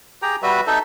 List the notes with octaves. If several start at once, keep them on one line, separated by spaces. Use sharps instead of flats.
G4 G#4 G5 A#5
G3 F#4 B4 E5
D#4 A4 E5